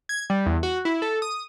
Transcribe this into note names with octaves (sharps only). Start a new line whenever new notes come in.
G#6
G3
E2
F#4
E4
A4
D#6